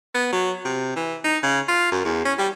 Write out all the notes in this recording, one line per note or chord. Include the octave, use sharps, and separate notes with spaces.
B3
F#3
C3
E3
D#4
C#3
F4
F#2
E2
C#4
G3